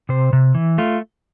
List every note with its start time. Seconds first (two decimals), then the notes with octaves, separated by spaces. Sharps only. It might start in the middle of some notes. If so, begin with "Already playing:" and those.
0.09 C3 C5
0.33 C3
0.55 E3
0.78 A3 F4